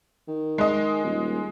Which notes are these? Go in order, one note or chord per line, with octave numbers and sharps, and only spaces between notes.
D#3
G#3 D#5
D#1